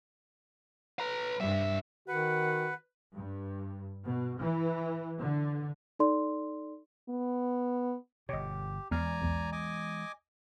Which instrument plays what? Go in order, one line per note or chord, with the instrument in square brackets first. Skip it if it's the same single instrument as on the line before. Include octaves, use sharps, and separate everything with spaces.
[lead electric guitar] B4 A#5
[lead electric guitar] C2 E5 [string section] G2
[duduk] D#3 [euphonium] F#4 [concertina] B4 [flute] F#5
[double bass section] G2
B2
E3
D3
[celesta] D#4 A4 D5 C6
[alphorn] B3
[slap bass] G1 B2 [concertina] G4 [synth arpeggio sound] C#5 D#5
[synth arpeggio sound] E2 F6 [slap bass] E3 G#3 B3 [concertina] D5 G#5 A#5
[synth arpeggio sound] B1 E2
[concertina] D#5 G#5 D6